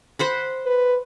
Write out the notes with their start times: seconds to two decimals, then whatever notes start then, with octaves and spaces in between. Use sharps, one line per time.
0.19 C5 F#5 B5
0.66 B4